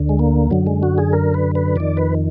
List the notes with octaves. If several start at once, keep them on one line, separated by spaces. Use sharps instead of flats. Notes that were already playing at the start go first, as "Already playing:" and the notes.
Already playing: D2 D3
G#3
A#3
F#2 D3 F#3
G#3
F#4
G#4
A#4
B4
B4
F2 D#3 D5
B4